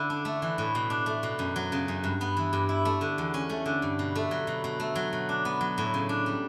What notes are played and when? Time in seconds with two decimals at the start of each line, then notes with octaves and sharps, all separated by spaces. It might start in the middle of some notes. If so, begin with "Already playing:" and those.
Already playing: D3 E4
0.10 D4
0.25 A3
0.42 E3
0.58 A2
0.75 B2
0.90 D4
1.06 A3
1.23 B2
1.39 F#2
1.56 F#3
1.72 C#3
1.88 F#2
2.04 G2
2.21 B3
2.37 E3
2.53 G2
2.69 E4
2.85 A3
3.01 D3
3.18 E2
3.34 C#4
3.49 A3
3.66 D3
3.82 G2
3.99 B2
4.15 A3
4.31 F#3
4.47 B2
4.64 B2
4.80 A3
4.96 F#3
5.13 B2
5.29 D4
5.45 B3
5.61 F#3
5.78 A2
5.94 C#3
6.09 D4
6.26 G3